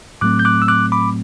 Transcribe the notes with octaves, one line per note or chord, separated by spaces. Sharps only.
A2 F#3 A3 C4 D6 F#6
G6
D6 F#6
E6
D6 F#6
B5 D6